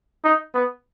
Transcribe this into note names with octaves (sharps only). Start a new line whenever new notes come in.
D#4
B3